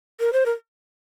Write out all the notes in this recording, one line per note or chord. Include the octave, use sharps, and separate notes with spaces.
A#4
C5
A#4